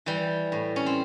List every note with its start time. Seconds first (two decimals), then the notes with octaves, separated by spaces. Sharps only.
0.06 E3 G3
0.52 A2
0.76 C#4
0.86 C4